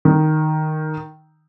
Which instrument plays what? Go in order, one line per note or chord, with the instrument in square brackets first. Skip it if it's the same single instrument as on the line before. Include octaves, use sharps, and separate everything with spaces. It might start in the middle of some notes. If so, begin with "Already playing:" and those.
[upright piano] D#3